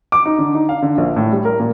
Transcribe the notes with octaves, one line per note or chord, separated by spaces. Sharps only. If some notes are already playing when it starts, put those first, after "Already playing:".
D6
D#4
D3
D#4
F5
D3
A#1
A2
G3
A#4
A#2